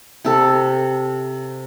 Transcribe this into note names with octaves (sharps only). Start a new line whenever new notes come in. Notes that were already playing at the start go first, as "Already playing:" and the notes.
C3 A4